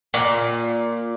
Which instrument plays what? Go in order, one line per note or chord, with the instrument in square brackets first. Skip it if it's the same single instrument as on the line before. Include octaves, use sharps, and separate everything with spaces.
[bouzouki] A#2